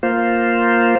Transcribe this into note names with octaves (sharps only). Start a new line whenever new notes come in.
A#3 F4 C5